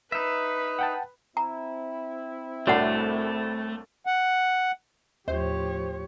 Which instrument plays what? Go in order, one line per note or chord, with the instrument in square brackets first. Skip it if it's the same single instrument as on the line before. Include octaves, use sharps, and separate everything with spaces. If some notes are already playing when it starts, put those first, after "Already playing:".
[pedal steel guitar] D#4 E5 [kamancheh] B4
[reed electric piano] F#5 G5 A5
[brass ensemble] C4 E4 [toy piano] A#5
[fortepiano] C2 A2 D4 [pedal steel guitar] A3 [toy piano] F#4 F#5
[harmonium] F#5
[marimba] D#2 [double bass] A2 F3 [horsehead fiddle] G4 C#5 [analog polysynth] C5